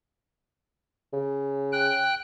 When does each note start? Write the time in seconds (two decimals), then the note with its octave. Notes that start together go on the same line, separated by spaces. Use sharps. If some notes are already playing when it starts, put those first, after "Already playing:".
1.13 C#3
1.73 G5 F#6